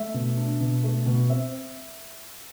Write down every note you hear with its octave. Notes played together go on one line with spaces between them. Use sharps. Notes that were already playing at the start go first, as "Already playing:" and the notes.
Already playing: A3 E5
B2
D4
B2
A3
B2
C4 E5